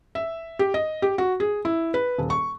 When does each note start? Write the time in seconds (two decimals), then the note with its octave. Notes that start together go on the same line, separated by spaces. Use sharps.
0.15 E5
0.59 G4
0.74 D#5
1.02 G4
1.18 F#4
1.40 G#4
1.65 E4
1.94 B4
2.18 D#1
2.30 C#6